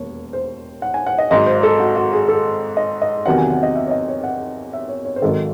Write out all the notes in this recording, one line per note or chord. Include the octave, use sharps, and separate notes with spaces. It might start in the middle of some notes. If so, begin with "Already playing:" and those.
Already playing: E1 D#2 C#5
C5
F#5
G#5
F#5
D#5
G#1 G#2 F#3 D#5
C5
A4
F#4
F#4
G#4
A4
D#5
D#5
E2 C3 D#3 F#3 F#5
G#5
F#5
D#5
E5
C#5
D#5
C#5
F#5
E5
C#5
C#5
C5
G#1 G#2 D#3 F#3 A4